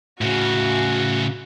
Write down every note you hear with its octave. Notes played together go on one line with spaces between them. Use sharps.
A2 C#3 F#4